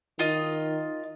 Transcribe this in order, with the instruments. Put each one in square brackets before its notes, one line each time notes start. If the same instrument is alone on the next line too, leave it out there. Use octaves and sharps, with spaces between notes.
[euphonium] D#3 [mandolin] F4 D#5